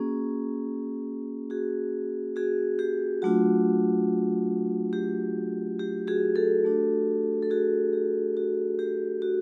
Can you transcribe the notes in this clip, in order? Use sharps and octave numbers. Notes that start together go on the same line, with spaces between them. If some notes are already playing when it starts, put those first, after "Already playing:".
Already playing: A#3 C#4 F#4 G#4
F#4 G#4
F#4 G#4
G4
F#3 A3 D4 F4 F#4
G4
G4
F#4 G#4
G4 A4
A3 D4 F#4
A4
F#4 G#4
G4
F#4
G4
F#4